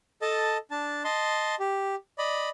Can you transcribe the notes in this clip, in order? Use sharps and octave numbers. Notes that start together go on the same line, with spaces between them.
A4 D#5 A5
D4 A5
D#5 A5 C6
G4
D5 D#5 B5